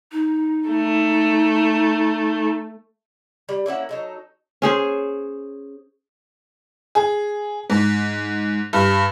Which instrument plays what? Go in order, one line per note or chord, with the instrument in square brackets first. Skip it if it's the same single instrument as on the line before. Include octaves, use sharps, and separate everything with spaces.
[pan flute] D#4
[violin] A3
[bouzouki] G3
A#3 C#4 E4 F#5
F#3 D#4 A4
[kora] C#4 G#4 C5
[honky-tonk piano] G#4
G#2
G2